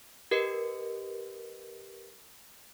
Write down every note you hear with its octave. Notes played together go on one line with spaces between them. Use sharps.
G4 A#4 B4 D#5 C#7